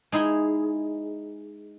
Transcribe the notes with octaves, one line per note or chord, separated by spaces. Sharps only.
G#3 D#4 E4 G#4